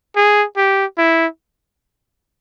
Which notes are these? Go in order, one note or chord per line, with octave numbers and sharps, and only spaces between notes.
G#4
G4
E4